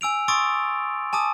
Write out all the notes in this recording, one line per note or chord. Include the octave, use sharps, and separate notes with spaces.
G#5 E6 D7 F7
C6 C#6 D#6 E6 A6 D7
G#5 A5 D6 D#6